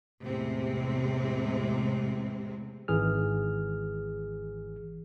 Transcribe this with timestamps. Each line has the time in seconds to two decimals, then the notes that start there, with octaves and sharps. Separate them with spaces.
0.23 E2 A2 C3 G#3 C4
2.88 G#1 E3 G#4 F6